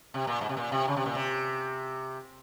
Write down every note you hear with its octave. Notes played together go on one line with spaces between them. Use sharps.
C3
A#2
G#2
C3
A#2
C3
C#3
C3
A#2
C3